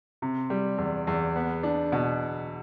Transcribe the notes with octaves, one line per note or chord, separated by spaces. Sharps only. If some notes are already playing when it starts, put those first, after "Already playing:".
C3
G3
E2
E2
B3
D4
B2